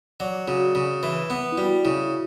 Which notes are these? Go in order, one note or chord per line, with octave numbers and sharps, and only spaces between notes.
F#3 D5
C#3 F#4
C#3
E3
B3
E4
G3 F#4
C#3 E4